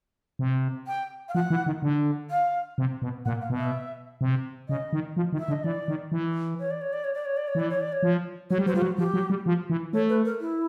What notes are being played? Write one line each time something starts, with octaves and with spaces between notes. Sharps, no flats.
C3
G5
F5
F3 F#5
E3
D#3
D3
F5
C3
B2
A#2 F#5
F5
B2
E5
C3
C#3 D#5
D#3
F3
D#3
E5
D3
D#5
E3 D5
D#3
E3
C#5
D5
C#5
D5
C#5
D5
C#5
D5
C#5
E3 D5
C#5
D5
C#5
F3
F#3 C#5
G3
F#3 C5
G3 F4
F#3 F#4
F3 G4
F#3
G3
F3
E3
A3 C#5
B4
A#4
E4